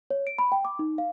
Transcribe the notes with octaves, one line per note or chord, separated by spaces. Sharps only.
C#5
D7
B5
G5
D6
D#4
F5